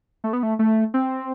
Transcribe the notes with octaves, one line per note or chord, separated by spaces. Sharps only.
A3
B3
A3
A3
C4